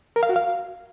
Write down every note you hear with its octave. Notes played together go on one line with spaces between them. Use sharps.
A#4
F5
F#4
F5